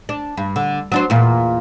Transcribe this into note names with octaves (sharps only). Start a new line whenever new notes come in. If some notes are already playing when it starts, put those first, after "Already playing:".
D4
G2
D3
F#3 D4 C5
E2 A#2